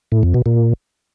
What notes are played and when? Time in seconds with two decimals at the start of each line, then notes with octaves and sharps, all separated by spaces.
0.12 A2
0.23 F2
0.34 B2
0.46 A#2